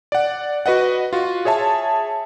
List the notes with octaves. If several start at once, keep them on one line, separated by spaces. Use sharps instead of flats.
D5 F#5
F#4 B4 D#5 F#5
F4 F#4
G#4 C#5 E5 A5